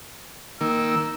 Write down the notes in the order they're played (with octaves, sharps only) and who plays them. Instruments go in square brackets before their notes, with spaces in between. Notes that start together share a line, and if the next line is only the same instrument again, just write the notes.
[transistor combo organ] D#3 A#3 [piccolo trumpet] E6